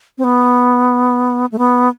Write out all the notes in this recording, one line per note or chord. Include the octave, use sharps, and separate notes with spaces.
C4
B3
A3
B3